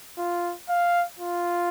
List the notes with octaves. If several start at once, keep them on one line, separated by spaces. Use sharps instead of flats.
F4
F5
F4